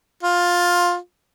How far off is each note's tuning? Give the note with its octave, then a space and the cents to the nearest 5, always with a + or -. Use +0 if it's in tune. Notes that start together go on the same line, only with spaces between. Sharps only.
F4 +15